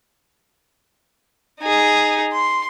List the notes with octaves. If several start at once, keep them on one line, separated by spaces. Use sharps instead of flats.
D#4 G#4
C6